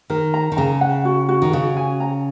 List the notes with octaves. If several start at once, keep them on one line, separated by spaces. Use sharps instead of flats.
D#3 A#4
A#5
D#3
C#3 A#5
F#5
F#4
F#4
D#3
C#3 F#4
G#5
A#5